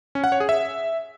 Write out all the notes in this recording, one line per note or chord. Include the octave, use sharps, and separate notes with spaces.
C#4
F#5
C#5
G#4
E5